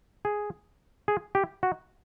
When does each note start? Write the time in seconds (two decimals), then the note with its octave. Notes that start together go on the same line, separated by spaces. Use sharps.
0.25 G#4
1.08 G#4
1.35 G4
1.63 F#4